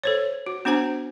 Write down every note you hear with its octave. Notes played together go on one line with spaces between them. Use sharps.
A4 C5 C#5
F#4
B3 D4 F#4 C5 G#5 A#5